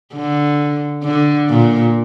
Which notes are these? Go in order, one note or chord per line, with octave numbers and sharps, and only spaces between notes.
D3
D3
A#2